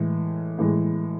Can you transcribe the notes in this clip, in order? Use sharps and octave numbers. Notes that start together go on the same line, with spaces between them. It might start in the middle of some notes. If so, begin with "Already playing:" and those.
Already playing: A2 E3 G#3
A2 E3 G#3